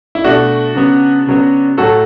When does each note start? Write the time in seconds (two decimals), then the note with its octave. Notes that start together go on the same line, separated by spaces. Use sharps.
0.15 E4
0.24 B2 A3 D4 F#4
0.75 C#3 F#3 B3
1.27 C#3 F#3 B3
1.77 A2 F#3 A3 F#4 A4